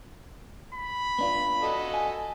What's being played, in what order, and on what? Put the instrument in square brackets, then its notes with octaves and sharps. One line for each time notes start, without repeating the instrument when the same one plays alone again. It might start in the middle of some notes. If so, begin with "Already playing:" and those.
[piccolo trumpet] B5
[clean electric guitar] B3 D4 F4
[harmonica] F#4 A4 D#5
[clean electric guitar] G#5